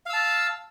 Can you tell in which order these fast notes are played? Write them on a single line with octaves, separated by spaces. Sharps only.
F5 E6 A5